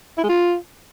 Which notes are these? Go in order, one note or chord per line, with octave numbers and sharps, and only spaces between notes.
E4
G#3
F4